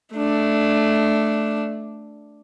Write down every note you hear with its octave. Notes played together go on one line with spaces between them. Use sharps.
A3 D4